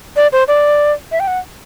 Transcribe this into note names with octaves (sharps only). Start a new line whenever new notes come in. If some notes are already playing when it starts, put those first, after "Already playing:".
D5
C5
D5
E5
G5
F#5